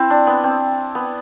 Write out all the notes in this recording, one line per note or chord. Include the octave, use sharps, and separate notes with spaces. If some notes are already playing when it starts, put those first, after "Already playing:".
Already playing: C4 E4
D4
B3
C4
B3